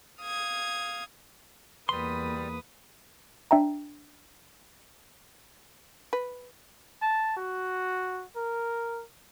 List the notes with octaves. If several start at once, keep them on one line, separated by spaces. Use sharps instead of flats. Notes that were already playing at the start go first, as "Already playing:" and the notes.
F5 D#6 G#6
E2 G3 A#3 B4 C6 D#6
D4 E5 G5 A#5
B4
A5
F#4
A#4